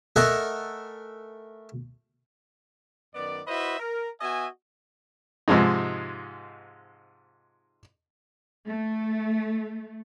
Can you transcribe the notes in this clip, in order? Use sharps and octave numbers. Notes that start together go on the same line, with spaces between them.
A3 A4 A#4 D#5 F#5 G#5
F#2 D#3 B3 D5
E4 F#4 B4 C5 D#5 E5
A#4
B3 F#4 D#5 E5 G#5
G#2 C3 F3 G#3 D#4
A3